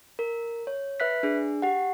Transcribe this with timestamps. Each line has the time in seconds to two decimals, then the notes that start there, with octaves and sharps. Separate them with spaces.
0.19 A#4
0.67 C#5
1.00 B4 E5 F#6 B6
1.23 D4 G#4
1.62 G4 F#5